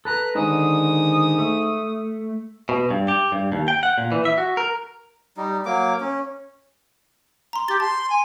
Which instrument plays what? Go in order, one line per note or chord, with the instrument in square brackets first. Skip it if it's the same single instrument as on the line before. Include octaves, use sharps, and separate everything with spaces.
[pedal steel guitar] A4 B4 A#5 [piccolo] F#6
[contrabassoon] G#2 [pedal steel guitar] D3 D#3 [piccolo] D#6
[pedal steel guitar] A3
[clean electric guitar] B2
G2
G4
G2
D#2
G5
F#5
A#2
E3
E5
F#4
A#4
[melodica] G3 D#4
F#3 A#3 D6
C#4
[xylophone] A#5 C6
[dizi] G4 [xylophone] A6 G7
[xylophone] A5 [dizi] C6
[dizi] G#5